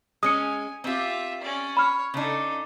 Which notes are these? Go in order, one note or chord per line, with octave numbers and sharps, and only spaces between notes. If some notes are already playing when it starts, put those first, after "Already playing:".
G#3 C#4 G#5 D#6 C#7
C4 F4 G4 E5
C#4 D5
C#5 B5 F6
C#3 D4 D#4 A4